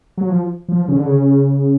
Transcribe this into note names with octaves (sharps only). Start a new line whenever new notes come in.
F#3
F3
F3
C#3
D3
C#3